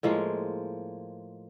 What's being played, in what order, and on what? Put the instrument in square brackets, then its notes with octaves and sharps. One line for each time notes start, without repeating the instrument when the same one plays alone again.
[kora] A2 F3 G#3 A#3